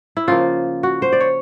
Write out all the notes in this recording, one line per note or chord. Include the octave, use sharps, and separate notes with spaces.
E4
C#3 F3 A#3 F4
F#4
C5
D5
C#5